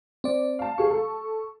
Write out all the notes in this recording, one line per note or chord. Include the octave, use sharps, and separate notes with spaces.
C4 D5
F5 A5
G4 G#4 F5 C#6
A4